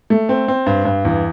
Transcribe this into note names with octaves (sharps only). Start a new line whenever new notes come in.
A3
C4
C4
G2
G2
E2